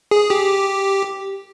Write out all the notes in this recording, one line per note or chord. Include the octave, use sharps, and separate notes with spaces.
G#4
G4